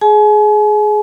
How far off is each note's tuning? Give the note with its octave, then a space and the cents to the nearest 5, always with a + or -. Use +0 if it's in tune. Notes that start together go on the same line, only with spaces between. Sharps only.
G#4 +15 G#5 +40